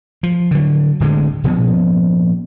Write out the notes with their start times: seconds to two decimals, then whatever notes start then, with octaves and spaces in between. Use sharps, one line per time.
0.23 F3
0.51 D3 F#3
1.00 D1 D2 D3 G#3
1.44 A#2 F3 B3 C#4